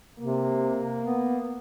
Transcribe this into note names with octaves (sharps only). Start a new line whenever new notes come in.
C3 A#3
B3